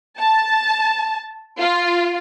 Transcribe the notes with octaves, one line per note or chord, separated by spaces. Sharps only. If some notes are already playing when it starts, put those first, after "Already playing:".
A5
F4